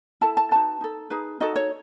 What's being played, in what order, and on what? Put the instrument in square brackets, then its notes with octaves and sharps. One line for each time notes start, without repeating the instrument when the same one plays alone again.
[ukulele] E4 A4 A5
A5
D#4 F#4 B4 A5
D#4 A4
D#4 G#4 B4
D#4 F#4 A4 D#5
C#5